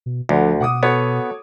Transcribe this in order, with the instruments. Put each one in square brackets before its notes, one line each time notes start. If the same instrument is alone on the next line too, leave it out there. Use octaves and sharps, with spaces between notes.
[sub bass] B2
[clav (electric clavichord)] D2 [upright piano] D3 [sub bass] F3
[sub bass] B2 [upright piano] F#5 D6 D#6
[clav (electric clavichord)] B3 [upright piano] F#4 A4 C#5